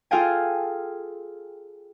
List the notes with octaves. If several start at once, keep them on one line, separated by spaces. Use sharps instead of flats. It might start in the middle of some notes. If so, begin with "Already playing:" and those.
F4 G#4 A4 F5 G5 G#5